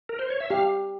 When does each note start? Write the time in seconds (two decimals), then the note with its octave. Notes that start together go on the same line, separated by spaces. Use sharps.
0.09 A#4
0.19 C5
0.30 C#5
0.40 E5
0.50 G4 F5